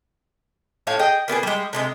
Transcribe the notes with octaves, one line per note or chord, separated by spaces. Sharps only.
A2 C#4 C#5 F5
G#4 D#5 G5
A#3 B3 G4 G#4
G3 G#3
C3 D#3 G#3